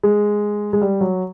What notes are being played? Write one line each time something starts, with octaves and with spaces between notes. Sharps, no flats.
G#3
G#3
G3
F#3